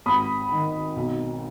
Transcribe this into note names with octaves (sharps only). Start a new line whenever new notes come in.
G#1 B5 D#6
D#3
B1